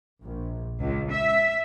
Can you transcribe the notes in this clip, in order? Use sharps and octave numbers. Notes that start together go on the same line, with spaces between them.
A#1
C#2
E5